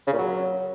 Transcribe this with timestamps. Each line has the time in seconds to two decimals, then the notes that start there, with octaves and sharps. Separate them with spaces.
0.07 C#3
0.13 A#2
0.18 F#3